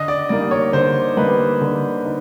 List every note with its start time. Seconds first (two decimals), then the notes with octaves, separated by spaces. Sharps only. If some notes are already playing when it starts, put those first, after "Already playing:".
Already playing: D3 D#5
0.08 D5
0.29 G3 A#3 D#4 D5
0.51 C#5
0.73 D3 C5
1.17 G3 A#3 D#4 B4
1.61 D3
2.05 D#4